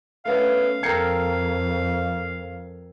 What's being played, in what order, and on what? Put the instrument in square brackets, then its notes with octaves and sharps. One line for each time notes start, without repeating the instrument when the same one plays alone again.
[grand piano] A3 B3 C#4 [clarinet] F5
[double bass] F2 [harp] A4 A#4 G5 [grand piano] G#6 C7 C#7